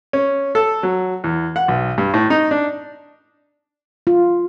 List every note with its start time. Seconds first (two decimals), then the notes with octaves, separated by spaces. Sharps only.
0.13 C#4
0.55 A4
0.83 F#3
1.24 E2
1.56 F#5
1.68 B1
1.98 G2
2.14 A2
2.30 D#4
2.51 D4
4.07 F4